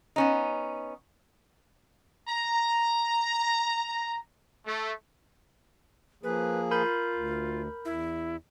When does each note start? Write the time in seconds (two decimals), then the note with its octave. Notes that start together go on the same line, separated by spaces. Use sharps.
0.16 B3 C#4 D#4
2.28 A#5
4.66 A3
6.23 F3 A#3 G#4 B4
6.71 F4 A#4 B5 G6
7.14 D2
7.85 E2 E4